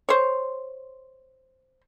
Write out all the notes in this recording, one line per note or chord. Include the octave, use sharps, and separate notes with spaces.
C5 C#5